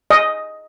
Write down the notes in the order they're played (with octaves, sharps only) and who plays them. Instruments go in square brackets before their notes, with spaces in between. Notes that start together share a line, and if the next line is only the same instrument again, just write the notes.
[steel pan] D#5